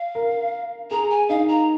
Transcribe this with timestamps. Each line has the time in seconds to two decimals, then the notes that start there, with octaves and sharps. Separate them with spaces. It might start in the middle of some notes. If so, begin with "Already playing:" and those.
Already playing: F5
0.15 A#4
0.91 G#4 A#5
1.10 G#5
1.29 D#4 F5
1.48 A#5